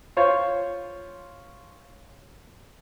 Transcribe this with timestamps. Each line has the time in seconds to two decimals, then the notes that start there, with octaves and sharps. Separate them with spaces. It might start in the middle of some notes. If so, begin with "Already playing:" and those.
0.17 F4 C5 C#5